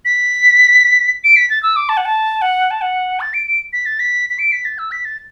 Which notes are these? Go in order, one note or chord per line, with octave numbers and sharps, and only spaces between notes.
B6
D7
B6
A6
E6
D6
A5
F#5
A5
F#5
A5
F#5
A6
D7
D7
B6
A6
B6
B6
D7
B6
A6
E6
B6
A6